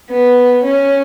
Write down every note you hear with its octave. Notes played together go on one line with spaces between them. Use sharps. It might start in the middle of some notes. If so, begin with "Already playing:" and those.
B3
C#4